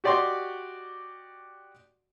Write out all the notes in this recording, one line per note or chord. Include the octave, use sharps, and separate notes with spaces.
F#4 G4 D5 D#5 C6 C#6